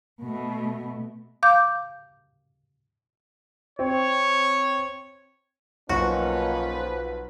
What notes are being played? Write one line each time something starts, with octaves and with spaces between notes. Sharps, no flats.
B2 A3
F5 D6 G6
C4 C#5
B1 F3 A#3 C#4 D#4 F#4 B4